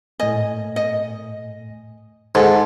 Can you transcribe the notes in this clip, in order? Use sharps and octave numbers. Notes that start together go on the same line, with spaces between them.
A2 A3 D#5 G#5
D#5
G#2 G#4 A4 D#5 F#5